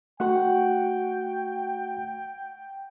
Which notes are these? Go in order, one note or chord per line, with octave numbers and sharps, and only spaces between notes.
A3 F#4 F#5 G5 C#6